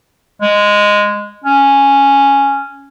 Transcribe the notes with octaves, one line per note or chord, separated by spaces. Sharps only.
G#3
C#4